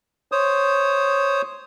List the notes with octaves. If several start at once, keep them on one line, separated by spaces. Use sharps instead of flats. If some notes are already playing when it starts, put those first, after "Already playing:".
C5 C#5 D#6